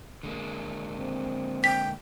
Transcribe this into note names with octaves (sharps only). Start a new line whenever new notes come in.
D3 G#3 A#3
C4
G5 B6